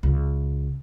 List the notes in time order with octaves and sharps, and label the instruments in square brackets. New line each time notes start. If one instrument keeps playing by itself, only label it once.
[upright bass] C#2